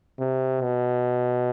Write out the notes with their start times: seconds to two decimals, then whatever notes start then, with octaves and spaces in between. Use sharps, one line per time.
0.19 C3
0.62 B2